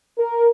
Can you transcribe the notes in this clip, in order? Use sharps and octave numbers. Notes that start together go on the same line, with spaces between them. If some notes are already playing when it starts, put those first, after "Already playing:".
A#4